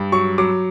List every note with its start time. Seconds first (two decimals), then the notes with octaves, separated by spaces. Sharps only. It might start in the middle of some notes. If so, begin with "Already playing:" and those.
Already playing: G2
0.12 F#3 C#6
0.38 F#3 D6